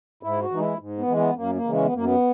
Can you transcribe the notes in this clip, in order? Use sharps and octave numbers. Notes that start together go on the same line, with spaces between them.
G#2 E4
F#4
E3 G#3 D#4
E4
G#2
B3
E3 G#3
B3
F#2 A#3
A#3
C#3 E3 G#3
C#4
B3
F#2 A#3
B3